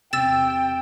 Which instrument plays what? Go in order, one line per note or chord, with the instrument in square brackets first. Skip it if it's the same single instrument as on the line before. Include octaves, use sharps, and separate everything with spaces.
[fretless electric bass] E1 C3 [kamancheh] G5 [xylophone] E6 A6 E7